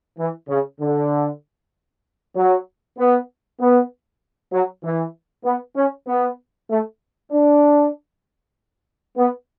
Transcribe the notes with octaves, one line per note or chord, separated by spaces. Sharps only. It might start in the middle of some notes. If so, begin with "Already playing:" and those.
E3
C#3
D3
F#3
B3
B3
F#3
E3
B3
C#4
B3
A3
D4
B3